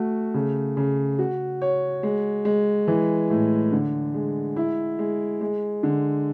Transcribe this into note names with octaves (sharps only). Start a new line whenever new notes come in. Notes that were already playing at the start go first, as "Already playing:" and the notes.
Already playing: A3 F#4
C#3
C#3
F#4
C#5
G#3
G#3
E3
A2
D3
G#3
E4
G#3
G#3
D3